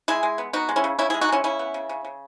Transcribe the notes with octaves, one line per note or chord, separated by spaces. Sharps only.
G#3 E4 G#4
G#3
B3
B3 D#4 F#4
G#3
C#4 E4
C#3
C#3 C#4 E4
E4 G#4
G#3
D#4 F#4
G#3 C#4 E4
C#3 C#4 E4
B3
C#3
C#3
C#3